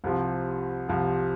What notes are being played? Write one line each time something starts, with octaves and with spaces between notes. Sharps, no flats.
C2 C3 F3
C2 C3 F3